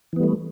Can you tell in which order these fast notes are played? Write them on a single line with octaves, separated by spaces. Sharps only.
E3 B3 G3 A3